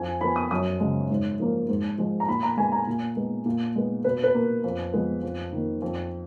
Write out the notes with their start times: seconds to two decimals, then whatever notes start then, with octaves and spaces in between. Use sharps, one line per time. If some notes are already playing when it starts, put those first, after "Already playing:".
Already playing: F2 G#5
0.21 F3 B3 B5
0.36 D#6
0.51 F#2 D#6
0.80 C#3 G#3
1.10 G#2
1.40 F3 A#3
1.69 G#2
1.98 F3 G#3
2.20 A#5
2.28 A#2 B5
2.43 A#5
2.57 G#3 B3 G#5
2.72 A#5
2.87 A#2
3.16 G#3 B3
3.46 A#2
3.75 G#3 B3
4.04 B2 B4
4.24 B4
4.34 A#3
4.64 F2
4.93 F3 G#3 B3
5.23 F2
5.52 D#3 A#3
5.82 F2